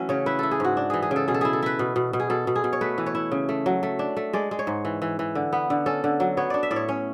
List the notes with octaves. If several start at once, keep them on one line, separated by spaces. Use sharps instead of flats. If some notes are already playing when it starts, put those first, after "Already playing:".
Already playing: E3 F#3 A3 C#4 E5
C#3 C#5
E4 B4
E4 A4
G#4
G#2 F#4
D4
E3 G#4
G#4
C#3
A4
B2 G#4
A4
E4 G#4
A4
E4 B4
B2
B2
B2
G#4
B2 A4
B2
G#4
B2
C#5
A3 B4
E3
C#5
E4
C#3
A3
F#3
A3
D4
A3
G#3 D5
G#3
C#5
G#2
E3
E3
E3
D3
B3
D3
C#4 A4
D3
F#3
B3 C#5
D4 D5
E5
A2 D5
C#5
C#4